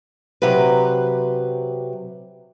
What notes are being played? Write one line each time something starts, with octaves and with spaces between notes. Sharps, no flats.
C3 F#3 G4 B4